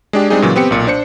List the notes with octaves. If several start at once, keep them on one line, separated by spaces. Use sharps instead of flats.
G#3 D4 G4
G3 G#3 C4 D4 D#4 G#4
A#2 C#3 E3 F#3
B3 C4 G4 C#7
B1 A#2
D4 C5 C#7